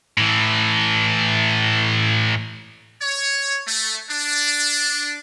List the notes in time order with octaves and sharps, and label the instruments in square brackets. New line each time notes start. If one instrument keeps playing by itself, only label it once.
[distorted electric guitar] A2 E3
[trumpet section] C#5
A3
D4